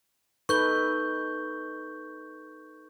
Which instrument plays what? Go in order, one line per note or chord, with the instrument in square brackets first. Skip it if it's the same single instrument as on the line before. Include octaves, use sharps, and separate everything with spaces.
[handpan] D#4 A4 B4 [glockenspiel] C#6 G6 G7